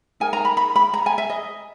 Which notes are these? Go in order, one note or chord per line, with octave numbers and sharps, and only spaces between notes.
D#4 A#4 G#5
A#5
B5
B5
B5
A#5
G#5
E5
D#5